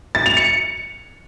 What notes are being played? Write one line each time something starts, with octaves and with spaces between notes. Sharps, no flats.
A6
F7
C#7